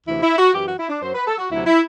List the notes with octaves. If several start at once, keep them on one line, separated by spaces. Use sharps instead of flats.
D2 C3 E3 E4
E4
F#4
F#2 E3 G4
F#4
E4
D4
F#2 F#3 C5
B4
A4
F#4
D2 C3 F#3 E4
E4